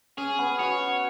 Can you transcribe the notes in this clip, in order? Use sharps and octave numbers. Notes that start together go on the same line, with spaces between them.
C#4 G#4
B3
F#4 C#5